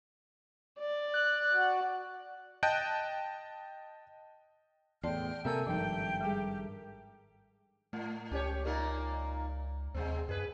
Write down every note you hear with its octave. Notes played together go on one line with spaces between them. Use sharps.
D5
F#6
F#4
D#5 G5 A5 F#6 G6 D7
E2 A2 D5 G5 A5 C6 F6
C3 A#3 A4 A#4 E5 G#5 E6 G6
G#1 G2 F3 D#4 G5
G3 G#3 G4 G#4
A2 A3
C#2 C#4 G4 C#5
A#2 A#3 D#4
D#2 C3 G#3 C4
F#2 G#4 B4